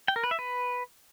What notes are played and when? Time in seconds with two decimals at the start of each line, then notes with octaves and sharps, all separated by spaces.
0.08 G5
0.16 A#4
0.24 B4
0.31 E5
0.39 B4